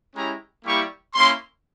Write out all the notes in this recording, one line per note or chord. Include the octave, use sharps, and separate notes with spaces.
G#3 C#4 E4 G4 A#5
G3 A#3 E4 G4 C#6
A#3 C#4 E4 C6